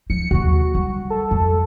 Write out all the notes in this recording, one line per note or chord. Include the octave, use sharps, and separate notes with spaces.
F3 C#7
D#2 C#3 F#4
G3
A4
F2